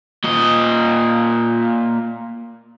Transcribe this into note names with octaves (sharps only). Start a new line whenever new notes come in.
A#2 D#5